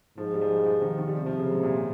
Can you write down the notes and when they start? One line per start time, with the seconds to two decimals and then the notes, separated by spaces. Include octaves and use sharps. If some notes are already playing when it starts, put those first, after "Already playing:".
0.18 G#2 F3
0.34 G3
0.41 F3
0.66 F3
0.82 D#3
0.99 D#3
1.08 G3
1.15 C3 F3
1.26 F3
1.39 C#3
1.51 G#2
1.63 A#2